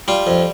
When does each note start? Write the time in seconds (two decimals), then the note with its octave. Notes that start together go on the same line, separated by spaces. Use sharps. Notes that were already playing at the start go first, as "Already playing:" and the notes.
0.08 G3 F4
0.27 F2